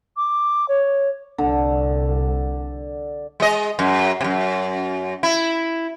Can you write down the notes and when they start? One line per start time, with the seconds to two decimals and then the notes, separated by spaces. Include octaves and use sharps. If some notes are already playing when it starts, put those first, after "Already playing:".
0.17 D6
0.69 C#5
1.38 C2 D3
3.40 G#3 D#5
3.79 F#2
4.21 F#2 C3
5.23 E4